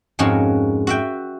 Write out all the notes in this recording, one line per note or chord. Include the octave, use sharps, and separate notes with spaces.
F2 G#2 G#3 C#4 F#4 A#4
F#4 E5 G5